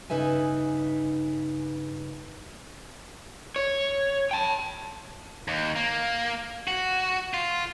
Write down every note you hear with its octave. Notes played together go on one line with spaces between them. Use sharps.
G2 C#3 D#4 B4 E5 G#5
C#5
G5 A5
D#2
A#3
F#4
F4